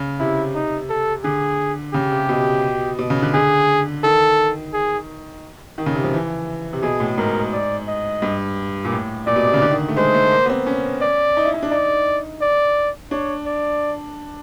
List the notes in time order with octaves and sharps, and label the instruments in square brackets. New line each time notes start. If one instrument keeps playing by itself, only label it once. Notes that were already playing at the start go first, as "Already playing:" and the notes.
Already playing: [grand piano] C#3
[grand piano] C3 [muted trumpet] E4
[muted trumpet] D#4
A4
[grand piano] D3 [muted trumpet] G#4
[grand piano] C#3 [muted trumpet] G4
[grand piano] C3
B2
B2
C#3
D3
[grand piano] D3 [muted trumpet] G#4
[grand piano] D#3 [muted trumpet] A4
[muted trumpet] G#4
[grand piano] D#3
C#3
C3
F3
E3
C3
[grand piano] B2 [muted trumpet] G#4
[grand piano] A2
[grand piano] G#2 [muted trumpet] A#4
[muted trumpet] D5
D#5
[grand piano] G2
A#2
A2
[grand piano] A#2 [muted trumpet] D5
[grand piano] B2
C3
C#3
D3
D#3
A3
[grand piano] G#3 [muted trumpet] C5
[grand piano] A3
A#3
B3
C4
C#4
[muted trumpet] D5
[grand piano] D#4
E4
D#4
D4
[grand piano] D#4 [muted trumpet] D5
[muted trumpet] D5
[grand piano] D4 [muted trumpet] C#5
[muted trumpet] D5